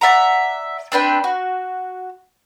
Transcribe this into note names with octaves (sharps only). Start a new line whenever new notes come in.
D5 E5 F#5 A#5
C4 D4 B4 G5
F#4